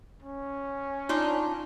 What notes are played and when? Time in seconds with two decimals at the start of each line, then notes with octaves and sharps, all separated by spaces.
0.22 C#4
1.09 D4 D#4 F4